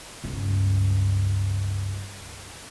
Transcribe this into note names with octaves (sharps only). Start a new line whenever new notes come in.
C#2 G2